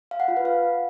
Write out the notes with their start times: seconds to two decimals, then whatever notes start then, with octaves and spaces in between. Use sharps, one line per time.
0.11 F5
0.20 F#5
0.28 F4
0.37 B4
0.45 F5